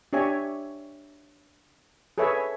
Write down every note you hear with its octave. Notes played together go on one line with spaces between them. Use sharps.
D4 G4 C#5 E5 G#5
G#4 A4 B4 C#5 E5